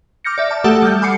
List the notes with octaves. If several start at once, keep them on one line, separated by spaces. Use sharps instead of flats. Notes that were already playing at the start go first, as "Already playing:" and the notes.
D6 F6 G6 A#6 C#7
D5 E5
A5
A3 G4 A4 F#5 A5 D#6
G3 F6 G6
G#5 B5 D6 C7 C#7